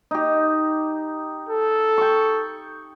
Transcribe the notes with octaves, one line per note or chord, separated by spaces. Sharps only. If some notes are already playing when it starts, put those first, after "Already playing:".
D#4 G4
A4
G5 C#6